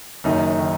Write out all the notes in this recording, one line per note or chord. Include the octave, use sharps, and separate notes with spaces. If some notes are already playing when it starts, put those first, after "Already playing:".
F#1 F#2 D#3 D#4
D#3